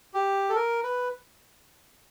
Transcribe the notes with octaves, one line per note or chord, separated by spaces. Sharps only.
G4
A4
A#4
B4